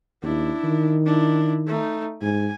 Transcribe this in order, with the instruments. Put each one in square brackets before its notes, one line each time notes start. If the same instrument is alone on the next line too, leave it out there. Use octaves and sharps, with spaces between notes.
[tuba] D#2 [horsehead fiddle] D4 E4
[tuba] D#3
[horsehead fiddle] D4 E4
A3 D#4
[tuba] G#2 [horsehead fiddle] G#5